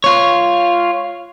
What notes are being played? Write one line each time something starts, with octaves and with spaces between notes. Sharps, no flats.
F4 C#5